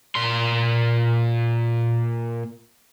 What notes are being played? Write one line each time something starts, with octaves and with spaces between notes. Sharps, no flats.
A#2 C6